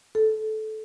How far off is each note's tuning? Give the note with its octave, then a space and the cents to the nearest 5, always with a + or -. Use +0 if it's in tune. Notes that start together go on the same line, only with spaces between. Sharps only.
A4 -15